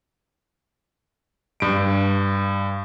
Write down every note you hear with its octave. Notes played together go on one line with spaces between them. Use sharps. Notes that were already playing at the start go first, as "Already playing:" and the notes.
G2 D7